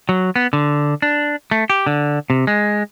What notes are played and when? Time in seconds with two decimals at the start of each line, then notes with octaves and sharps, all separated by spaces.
0.09 F#3
0.36 B3
0.53 D3
1.02 D4
1.51 A3
1.70 G4
1.87 D3
2.30 C3
2.47 G#3